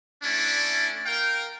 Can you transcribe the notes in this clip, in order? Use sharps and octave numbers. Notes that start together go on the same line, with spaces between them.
A3 C#4 D4 E4 D5
A#4 F5 G5